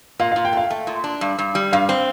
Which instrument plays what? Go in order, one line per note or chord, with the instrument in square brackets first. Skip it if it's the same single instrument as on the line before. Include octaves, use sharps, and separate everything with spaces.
[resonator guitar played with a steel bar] A#2 [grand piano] F5
[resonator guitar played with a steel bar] A#2 [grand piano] F5
[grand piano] G5
[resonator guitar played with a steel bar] A3 [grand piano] F5
[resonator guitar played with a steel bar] A3
A#2
D4
G2
G2
G3
[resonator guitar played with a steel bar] G2 [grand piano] F5
[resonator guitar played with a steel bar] C4